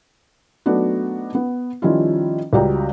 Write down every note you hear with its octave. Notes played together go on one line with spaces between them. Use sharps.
F#3 A3 B3 D4 D#4 F#4
B3
D#3 F3 G3 C#4 E4 F4
C#2 G3 F#4 D5 G5 A#5